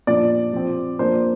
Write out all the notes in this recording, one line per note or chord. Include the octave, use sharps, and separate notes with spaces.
A#2 F3 D4 D5
F3 C4
F3 A#3 D4 C5